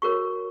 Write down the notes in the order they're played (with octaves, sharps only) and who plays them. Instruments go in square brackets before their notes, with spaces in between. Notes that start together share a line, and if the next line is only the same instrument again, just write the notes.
[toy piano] F#4 A#4 C#5 C#6